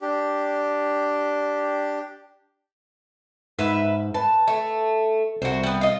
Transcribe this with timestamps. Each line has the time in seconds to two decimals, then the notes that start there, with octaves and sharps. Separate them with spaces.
0.01 D4 G4
3.59 G#2 B4 E5
4.14 B4 A5
4.48 A3
5.42 C2 F#4 C5
5.63 G3 B3
5.81 F4 D#5